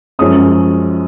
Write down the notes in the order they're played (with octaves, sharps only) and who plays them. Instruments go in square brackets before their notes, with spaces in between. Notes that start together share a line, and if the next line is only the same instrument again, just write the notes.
[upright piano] F#2 F3 G#3 C#4 D#6